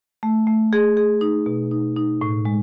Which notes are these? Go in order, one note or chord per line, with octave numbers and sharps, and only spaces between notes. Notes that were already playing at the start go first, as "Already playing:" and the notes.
A3
A3
G#4
G#4
D#4
B2
D#4
D#4
A2
G#3